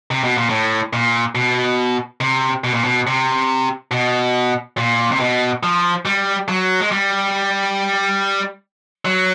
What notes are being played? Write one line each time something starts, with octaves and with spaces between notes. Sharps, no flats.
C3
B2
A#2
A2
A#2
B2
C3
B2
A#2
B2
C3
B2
A#2
C3
B2
F3
G3
F#3
G#3
G3
F#3